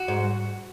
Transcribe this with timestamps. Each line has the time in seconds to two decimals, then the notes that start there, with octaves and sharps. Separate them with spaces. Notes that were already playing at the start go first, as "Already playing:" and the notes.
Already playing: F#4
0.08 G#2